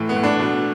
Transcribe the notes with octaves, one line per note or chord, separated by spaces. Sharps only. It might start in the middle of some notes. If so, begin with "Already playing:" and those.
Already playing: A2 E3
B3
A2
D4
B2